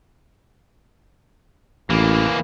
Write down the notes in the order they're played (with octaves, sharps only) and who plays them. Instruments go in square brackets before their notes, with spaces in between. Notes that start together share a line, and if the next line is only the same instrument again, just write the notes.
[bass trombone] A1 [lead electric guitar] E3 A#3